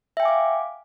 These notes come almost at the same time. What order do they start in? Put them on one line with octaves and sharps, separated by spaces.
E5 G5 G#5 D6 F5